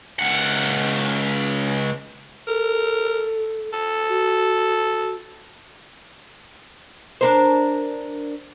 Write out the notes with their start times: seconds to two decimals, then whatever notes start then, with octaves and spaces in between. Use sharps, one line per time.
0.19 C#2 F#5
2.47 A4 A#4
3.73 A4
4.09 F#4
7.21 D4 A#4 C5